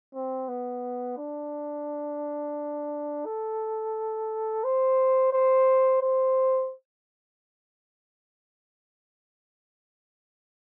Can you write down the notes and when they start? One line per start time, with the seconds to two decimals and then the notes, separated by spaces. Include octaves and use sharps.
0.14 C4
0.48 B3
1.18 D4
3.25 A4
4.64 C5
5.33 C5
6.01 C5